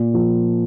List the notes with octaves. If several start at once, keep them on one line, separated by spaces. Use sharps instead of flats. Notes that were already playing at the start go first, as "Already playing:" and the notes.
Already playing: A#2
F3